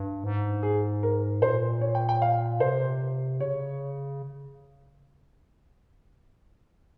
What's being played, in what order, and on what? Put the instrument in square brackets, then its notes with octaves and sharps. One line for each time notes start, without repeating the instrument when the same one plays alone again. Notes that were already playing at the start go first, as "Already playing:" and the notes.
Already playing: [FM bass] G2
G#2
[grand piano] G#4
A#4
[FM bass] A#2 [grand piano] C5
[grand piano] C#5
G5
G5
F5
[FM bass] C3 [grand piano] C5
[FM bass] C#3 [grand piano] C#5